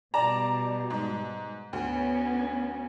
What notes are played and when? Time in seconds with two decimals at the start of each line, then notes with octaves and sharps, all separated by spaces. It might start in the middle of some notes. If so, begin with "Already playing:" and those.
0.14 B2 G3 D5 A5 A#5
0.90 G#2
1.73 D2 B3 C#4